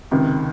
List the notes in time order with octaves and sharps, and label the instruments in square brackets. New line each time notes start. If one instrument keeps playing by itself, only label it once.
[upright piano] C#2 C3 D#3